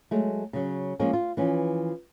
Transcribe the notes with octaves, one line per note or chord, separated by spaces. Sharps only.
F#3 G#3 A3
C#3 F#3
F3 G#3 A#3 C4 C#4
F4
E3 F3 C#4